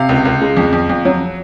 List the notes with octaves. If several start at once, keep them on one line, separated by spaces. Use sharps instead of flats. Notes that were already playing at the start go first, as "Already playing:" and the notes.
Already playing: C3 F5
C#2
C#2
G#3
F2
F2
F2
F#3